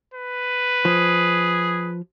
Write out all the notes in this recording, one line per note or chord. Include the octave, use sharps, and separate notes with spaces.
B4
F3 G#4